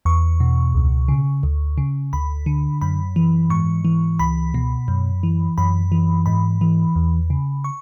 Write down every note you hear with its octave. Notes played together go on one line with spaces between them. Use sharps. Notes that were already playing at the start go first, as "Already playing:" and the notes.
E2 C#6
B2
C#2
C#3
D2
C#3
D2 B5
D3
F#2 B5
E3
G#2 C#6
E3
C#2 B5
B2
F#2
E3
F#2 B5
E3
G#2 B5
E3
E2
C#3
C#6